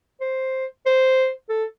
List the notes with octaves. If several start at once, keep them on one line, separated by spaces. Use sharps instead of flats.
C5
C5
A4